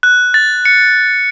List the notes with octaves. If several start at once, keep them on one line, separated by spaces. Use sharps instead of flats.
F#6
A6
C#7